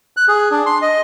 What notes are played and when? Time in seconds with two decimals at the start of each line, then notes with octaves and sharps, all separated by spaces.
0.17 F#6
0.28 G#4
0.51 D4
0.66 C6
0.82 D#5